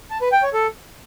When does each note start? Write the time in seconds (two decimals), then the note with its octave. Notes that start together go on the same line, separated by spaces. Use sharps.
0.11 A5
0.21 B4
0.32 G5
0.43 C#5
0.54 A4